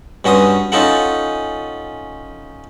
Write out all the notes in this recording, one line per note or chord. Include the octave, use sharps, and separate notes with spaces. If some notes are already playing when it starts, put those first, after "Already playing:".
G2 C#4 F#4 C6 D#6
C#4 D#4 F4 A4 F#5